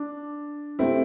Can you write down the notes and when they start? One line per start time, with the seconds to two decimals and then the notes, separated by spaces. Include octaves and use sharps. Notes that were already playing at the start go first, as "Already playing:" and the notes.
Already playing: D4
0.79 C3 A3 C4 E4